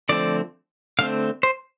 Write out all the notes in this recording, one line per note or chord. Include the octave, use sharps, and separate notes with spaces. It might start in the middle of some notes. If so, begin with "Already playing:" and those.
D3 F3 A3 C4 D5
D3 A3 C4 F5
C5